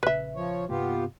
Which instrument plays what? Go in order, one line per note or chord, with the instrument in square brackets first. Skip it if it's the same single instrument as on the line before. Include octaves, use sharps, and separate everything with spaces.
[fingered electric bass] A#1 C#3 [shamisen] B4 E5
[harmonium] F3 C#5
[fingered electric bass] G2 C3 A#3 [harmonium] B3 F4 G4